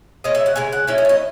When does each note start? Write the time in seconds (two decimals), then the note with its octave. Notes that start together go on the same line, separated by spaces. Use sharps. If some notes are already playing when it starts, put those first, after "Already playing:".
0.24 C#3 G#3 C#4 D#5
0.35 E5
0.46 F#5
0.56 C#3 G#3 G#5
0.73 F#5
0.87 F#3 C#4 E4 E5
0.98 D#5
1.05 C#5
1.09 D#5